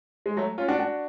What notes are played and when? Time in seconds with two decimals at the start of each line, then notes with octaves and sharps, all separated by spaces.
0.26 G#3
0.37 F#3 A3
0.58 C#4 F4
0.68 D4 F#4
0.79 D4 F#4